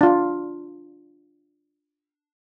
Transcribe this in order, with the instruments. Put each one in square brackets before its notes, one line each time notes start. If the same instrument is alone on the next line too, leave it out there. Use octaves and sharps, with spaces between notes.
[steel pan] D4 F4